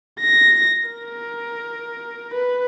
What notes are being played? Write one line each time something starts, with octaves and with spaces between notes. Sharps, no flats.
A#6
A#4
B4